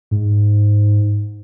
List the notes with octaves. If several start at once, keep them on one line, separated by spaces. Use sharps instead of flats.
G#2